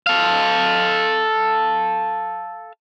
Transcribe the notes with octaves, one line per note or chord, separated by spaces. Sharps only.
A4 F5